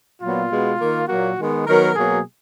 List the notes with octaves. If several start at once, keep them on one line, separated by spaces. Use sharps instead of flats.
A#2 F#3 B3 F4
B2 G#3 B3
D#3 A#3
A#2 F#3 A#3 F#4
D#3 G#3 B3
D#3 F#3 B3 A#4
B2 F#3 A#3 G#4